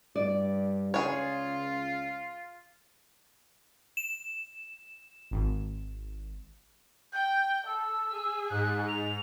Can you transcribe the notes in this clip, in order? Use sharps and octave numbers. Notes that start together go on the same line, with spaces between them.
G2 D5
C#2 F4 G#4 C#5
E7
G#1
G5 G6
A4 E6
G#4
G#2 F#6
F7